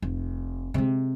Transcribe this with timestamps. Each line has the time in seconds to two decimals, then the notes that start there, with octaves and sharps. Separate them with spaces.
0.02 F1
0.74 C3 G#3